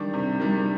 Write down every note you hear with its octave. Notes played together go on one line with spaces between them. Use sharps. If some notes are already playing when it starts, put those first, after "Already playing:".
Already playing: D#3 G3 D4
C3
D#3 G3 D4